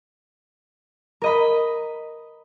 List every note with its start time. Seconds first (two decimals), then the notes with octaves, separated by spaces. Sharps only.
1.22 A#4 D#5 B5